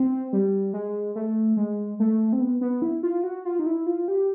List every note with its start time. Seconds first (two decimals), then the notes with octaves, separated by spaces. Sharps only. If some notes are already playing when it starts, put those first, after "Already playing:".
Already playing: C4
0.33 G3
0.73 G#3
1.15 A3
1.57 G#3
2.00 A3
2.33 C4
2.41 B3
2.61 B3
2.82 E4
3.03 F4
3.24 F#4
3.45 F4
3.59 D#4
3.66 E4
3.86 F4
4.08 G4